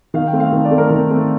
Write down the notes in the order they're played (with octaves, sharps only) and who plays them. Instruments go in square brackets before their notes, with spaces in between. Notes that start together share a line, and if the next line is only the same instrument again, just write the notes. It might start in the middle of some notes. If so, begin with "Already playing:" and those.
[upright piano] D#3 F5
G5
A3 C4
F5
D#3
D5
A3 C4 A4
A#4
D#3 A#4
A3 C4